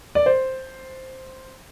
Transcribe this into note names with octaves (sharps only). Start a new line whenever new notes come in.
D5
C5